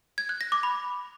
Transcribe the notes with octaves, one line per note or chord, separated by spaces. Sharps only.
G#6
F#6
A#6
D6
B5